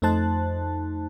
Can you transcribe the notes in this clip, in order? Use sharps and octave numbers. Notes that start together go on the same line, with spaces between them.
F2 A3 D#4 C5 A5 F#6